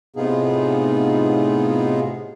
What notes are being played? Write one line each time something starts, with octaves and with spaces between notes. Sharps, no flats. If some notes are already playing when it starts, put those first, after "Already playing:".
A2 C3 B3 D#4 F4 G#4